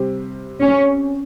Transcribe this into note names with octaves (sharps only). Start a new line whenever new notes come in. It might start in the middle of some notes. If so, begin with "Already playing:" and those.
Already playing: C3 G3 C4 G4
C#4